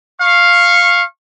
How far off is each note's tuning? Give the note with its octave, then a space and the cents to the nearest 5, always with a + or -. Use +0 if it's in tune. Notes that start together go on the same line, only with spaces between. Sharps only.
F5 +0 C#6 -20